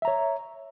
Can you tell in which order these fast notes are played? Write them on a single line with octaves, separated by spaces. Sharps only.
E5 A#5 C#5